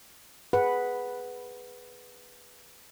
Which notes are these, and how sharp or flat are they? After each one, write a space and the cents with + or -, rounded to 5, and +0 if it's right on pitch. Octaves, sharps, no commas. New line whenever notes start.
G#4 +0 B4 +0 F#5 +0